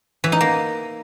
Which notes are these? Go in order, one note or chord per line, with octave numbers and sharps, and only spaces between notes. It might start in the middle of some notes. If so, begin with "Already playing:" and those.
E3
D#4
A#3